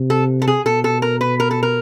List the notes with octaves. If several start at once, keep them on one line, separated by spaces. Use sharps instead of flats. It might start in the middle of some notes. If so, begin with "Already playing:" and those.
Already playing: C3
A4
A4
G#4
B2 A4
A4
A#4
B4
A#4
A4
A#4